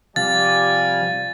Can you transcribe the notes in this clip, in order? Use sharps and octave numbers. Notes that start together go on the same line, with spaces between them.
C3 F3 G3 D5 F5 G#5 A6